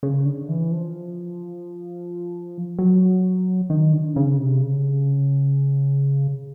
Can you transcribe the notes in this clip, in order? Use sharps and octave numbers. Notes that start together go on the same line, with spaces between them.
C#3
D3
E3
F3
F#3
D#3
D3
C#3
C3
C#3